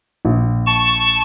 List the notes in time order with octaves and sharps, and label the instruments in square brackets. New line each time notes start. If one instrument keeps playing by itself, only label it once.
[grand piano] A#1
[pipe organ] A5 C#6